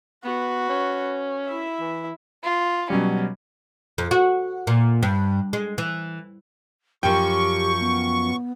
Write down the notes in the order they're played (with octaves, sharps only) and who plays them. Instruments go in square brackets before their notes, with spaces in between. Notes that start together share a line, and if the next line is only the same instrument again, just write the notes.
[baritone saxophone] B3 [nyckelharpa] F#4 B4
[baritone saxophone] C#4
[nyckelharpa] E4 E5
[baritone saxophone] E3
[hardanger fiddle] F4
[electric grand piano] B2 F#3 G3 [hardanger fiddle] C#4
[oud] F2
F#4
A#2
G2
G#3
E3
[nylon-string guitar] F#2 F3 [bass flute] G4 [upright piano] G5 [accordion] C#6
[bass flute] B3